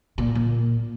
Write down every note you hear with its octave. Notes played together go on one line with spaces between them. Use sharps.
A#2
A#2